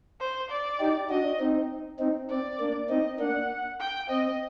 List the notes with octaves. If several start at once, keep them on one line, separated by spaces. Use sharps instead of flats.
C5
D5
D#4 G4
D4 F#4 D#5
C4 D#4
C4 D#4
C4 D5
A#3 D4
C4 D#4 D#5
A#3 D4 F#5
G5
C4 D#5